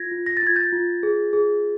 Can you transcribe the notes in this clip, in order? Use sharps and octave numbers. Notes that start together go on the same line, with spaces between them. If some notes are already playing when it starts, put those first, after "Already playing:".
Already playing: F4 G#6 A#6
F4
A#6
A6
F4 G#6
G6 A6
F4
G#4
G#4